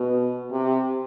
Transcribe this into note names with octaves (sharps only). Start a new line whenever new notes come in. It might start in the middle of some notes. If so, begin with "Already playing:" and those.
Already playing: B2
C3